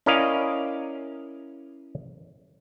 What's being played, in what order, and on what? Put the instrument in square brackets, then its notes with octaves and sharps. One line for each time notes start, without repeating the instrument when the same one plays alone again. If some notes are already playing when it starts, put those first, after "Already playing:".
[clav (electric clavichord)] C#4 E4 A#4 D5 D#5 F5